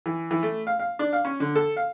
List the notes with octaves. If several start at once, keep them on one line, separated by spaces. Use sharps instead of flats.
E3
E3
A3
F5
F5
D4
F5
C#4
D3
A4
F5